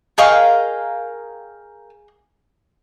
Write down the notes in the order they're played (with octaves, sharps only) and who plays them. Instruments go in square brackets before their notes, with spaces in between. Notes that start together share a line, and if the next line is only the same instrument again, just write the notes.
[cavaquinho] G#4 D#5 C#6 [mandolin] A#4 F5 G5